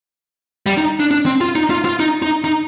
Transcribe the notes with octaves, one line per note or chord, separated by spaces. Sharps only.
G3
D#4
D4
D4
C4
F4
D#4
F4
F4
D#4
D#4
D#4